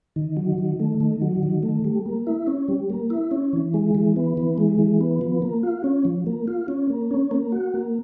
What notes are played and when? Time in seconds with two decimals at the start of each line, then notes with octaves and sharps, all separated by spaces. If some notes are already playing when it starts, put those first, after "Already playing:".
0.16 D#3
0.37 F#3
0.58 D#3
0.80 A3
1.00 D#3
1.22 F#3
1.43 D#3
1.63 A3
1.85 G3
2.06 A#3
2.27 E4
2.47 C#4
2.68 G3
2.90 A#3
3.10 E4
3.31 C#4
3.53 E3
3.74 G#3
3.95 E3
4.16 B3
4.37 E3
4.58 G#3
4.79 E3
5.01 B3
5.21 F3
5.42 A#3
5.63 F4
5.84 C#4
6.05 F3
6.26 A#3
6.48 F4
6.68 C#4
6.90 A#3
7.11 C#4
7.31 A#3
7.52 F#4
7.74 A#3